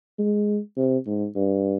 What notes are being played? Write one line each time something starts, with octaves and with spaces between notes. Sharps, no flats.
G#3
C3
G#2
G2